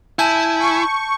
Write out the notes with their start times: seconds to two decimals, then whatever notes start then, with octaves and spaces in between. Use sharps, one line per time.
0.19 E4 G#5 A5 G6
0.60 C#6